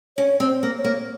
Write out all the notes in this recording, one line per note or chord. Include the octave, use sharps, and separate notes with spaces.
C#4 C#5
C4 C#5
C5
A#3
C#5
A#3